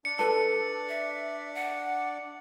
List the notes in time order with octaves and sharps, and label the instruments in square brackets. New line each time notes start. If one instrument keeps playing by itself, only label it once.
[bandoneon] D4 D5 [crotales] C#7
[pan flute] A4 [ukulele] B4 A5
[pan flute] E5
F#5